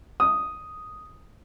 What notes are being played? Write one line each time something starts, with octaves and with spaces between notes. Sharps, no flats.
D#6